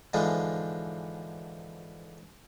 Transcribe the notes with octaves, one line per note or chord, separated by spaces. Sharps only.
G#2 D3 E3 F3 G#3